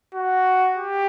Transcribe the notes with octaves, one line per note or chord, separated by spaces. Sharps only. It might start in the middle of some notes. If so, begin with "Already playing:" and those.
F#4
G4